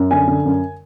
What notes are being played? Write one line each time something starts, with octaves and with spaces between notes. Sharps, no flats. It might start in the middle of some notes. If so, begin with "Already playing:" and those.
Already playing: F#2
D3 G#5
D3
F#2